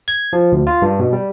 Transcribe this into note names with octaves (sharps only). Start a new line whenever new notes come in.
G#6
F3
D2
F4
G2
B2
G3